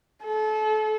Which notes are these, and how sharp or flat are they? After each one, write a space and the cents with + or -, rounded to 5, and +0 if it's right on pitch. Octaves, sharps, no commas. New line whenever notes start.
A4 -30